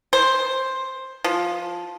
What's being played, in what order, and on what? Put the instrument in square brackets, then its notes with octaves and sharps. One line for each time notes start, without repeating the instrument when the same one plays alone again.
[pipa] C5
F3